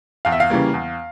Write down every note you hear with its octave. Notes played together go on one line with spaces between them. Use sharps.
E2 F5
E5
F5
C#3 E3 G3 A#3
E2